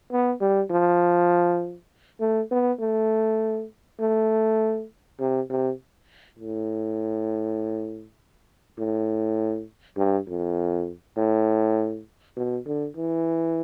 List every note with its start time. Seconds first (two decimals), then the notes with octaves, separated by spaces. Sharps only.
0.12 B3
0.41 G3
0.71 F3
2.20 A3
2.51 B3
2.80 A3
4.00 A3
5.20 C3
5.50 C3
6.39 A2
8.78 A2
9.97 G2
10.28 F2
11.17 A2
12.37 B2
12.66 D3
12.97 E3